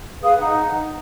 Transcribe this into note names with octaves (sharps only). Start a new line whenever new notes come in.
G#4 B4 F5 D#6
D#4 F#5